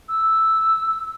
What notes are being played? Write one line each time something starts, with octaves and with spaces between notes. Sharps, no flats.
E6